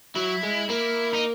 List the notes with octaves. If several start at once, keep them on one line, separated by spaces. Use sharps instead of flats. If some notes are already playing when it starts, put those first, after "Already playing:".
F#3 E4
G#3
A#3 E4
D#4